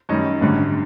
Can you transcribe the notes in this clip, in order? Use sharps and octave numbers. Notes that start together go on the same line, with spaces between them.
F#2 D#3 G3 C#5 D#5
G#1 F#2 D3 G3